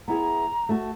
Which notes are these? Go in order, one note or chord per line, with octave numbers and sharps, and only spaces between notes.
B3 E4 G#4 A#5
A3 F#4